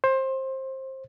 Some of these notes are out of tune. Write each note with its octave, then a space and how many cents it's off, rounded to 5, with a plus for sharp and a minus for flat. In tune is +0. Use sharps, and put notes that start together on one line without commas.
C5 +20